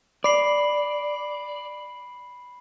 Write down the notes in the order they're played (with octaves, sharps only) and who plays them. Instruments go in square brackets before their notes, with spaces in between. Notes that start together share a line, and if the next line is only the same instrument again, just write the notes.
[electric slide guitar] D5 [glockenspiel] B5 C7 F#7